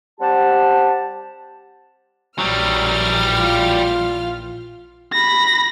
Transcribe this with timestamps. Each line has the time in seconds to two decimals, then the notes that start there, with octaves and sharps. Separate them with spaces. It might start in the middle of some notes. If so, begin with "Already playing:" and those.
0.20 G3 C4 G4 F#5 A5
2.38 A#1 E3 F#3 G3 F6
3.40 F4
5.13 B5 A#6